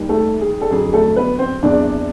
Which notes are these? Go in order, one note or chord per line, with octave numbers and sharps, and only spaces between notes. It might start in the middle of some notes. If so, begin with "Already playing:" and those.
Already playing: D#2 D#3 G3
A3 A4
G#4
A4
F2 D3 F#3 G#4
A3 A4
B3 B4
C4 C5
F#1 E2 C3 D4 D5